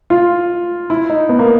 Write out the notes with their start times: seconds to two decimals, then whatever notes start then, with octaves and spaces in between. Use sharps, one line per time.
0.10 F4
0.90 E4
1.10 D#4
1.29 B3
1.39 A#3